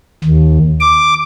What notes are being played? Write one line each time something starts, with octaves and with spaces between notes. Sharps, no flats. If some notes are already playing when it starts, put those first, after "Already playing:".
D#2
D6